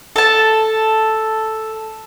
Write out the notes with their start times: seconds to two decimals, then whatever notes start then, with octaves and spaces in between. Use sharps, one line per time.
0.16 A4 A5